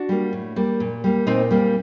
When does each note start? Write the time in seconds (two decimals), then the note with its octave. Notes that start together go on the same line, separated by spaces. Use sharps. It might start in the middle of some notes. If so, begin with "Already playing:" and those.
Already playing: D4 F#4
0.09 G3 A#3
0.33 A2
0.56 G3 A#3
0.80 A#2
1.04 G3 A#3
1.27 A#2 C4 D#4
1.51 G3 A#3